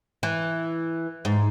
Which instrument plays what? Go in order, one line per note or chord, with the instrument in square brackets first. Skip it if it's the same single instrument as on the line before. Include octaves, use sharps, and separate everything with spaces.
[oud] E3
G#2